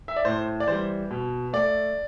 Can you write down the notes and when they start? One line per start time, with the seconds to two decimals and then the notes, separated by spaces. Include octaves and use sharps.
0.08 E5
0.16 D5
0.25 A2 C5
0.60 D5
0.68 E3 G3 C5
1.11 B2
1.53 A3 D5